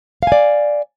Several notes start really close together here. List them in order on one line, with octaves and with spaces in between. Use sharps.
F5 G#5 D5